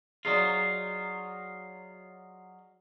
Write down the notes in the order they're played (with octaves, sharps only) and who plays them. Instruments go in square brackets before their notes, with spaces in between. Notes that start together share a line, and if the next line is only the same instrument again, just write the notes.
[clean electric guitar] F#3 D#4 F4 [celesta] G#4 D5